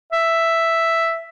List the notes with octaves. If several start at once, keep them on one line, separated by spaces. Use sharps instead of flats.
E5